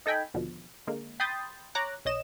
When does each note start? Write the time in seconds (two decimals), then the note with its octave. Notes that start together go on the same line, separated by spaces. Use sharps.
0.06 D#4 A4 D#5 G5 G#5 B5
0.34 D#2 B2 D3 F3
0.87 D3 G#3 A#3
1.20 G5 B5 C6 D#6 G6 A6
1.75 C#5 A#5 D6 F#6
2.05 B1 C#5 D#5 E7